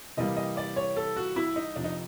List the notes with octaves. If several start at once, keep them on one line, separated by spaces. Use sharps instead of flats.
C3 E3 G3 A#3 D#5
D#5
D5
C#5
A4
F#4
E4
D#4
F2 C3 F3 D4
D#4